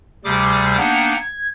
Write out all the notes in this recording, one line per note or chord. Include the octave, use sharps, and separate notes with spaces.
D2 C3 G3 G#4 D6
A#3 B3 D4 D#4 F#5 G5
G#6